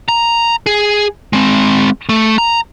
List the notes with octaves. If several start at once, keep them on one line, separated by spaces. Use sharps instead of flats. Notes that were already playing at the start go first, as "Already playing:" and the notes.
A#5
G#4
G#3 C4
A3
A#5